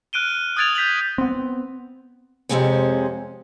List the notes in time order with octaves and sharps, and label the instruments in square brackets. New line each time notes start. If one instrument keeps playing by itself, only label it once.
[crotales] F6 F#6 D7 D#7 G7
D#6 F#6 G#6 A6 D7 F7
G6 B6 F7 F#7
[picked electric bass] B3 C4
[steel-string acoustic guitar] F2 G#2 C3 G#3 C4 C#4